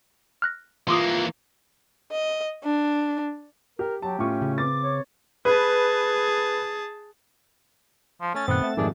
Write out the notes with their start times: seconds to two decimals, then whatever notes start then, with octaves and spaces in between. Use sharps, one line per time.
0.42 F6 F#6 A#6
0.88 E3 A#3 F4 C6 D6 D#6
2.12 D#5
2.63 D4
3.79 G4 A#4
4.02 F#3 G4 A5
4.19 A2 C#4 F4 C#6
4.42 C#3
4.58 C4 B4 D6 A6
4.83 C#5
5.45 G#4 B4 A5
8.21 F3
8.35 A3 C#4 A6
8.48 F#2 A#2 D#3 B3 C4 F#5
8.63 E5
8.77 F2 G#2 C3 D#3 D4 G#4